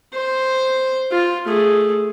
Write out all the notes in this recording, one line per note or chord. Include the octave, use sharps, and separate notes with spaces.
C5
F4
A3 G#4